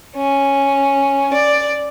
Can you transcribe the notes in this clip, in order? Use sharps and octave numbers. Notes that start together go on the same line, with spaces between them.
C#4
D5